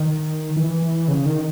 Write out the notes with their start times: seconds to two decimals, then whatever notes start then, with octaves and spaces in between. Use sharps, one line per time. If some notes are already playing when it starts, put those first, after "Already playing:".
Already playing: D#3
0.56 E3
0.82 E3
1.08 C#3
1.26 D#3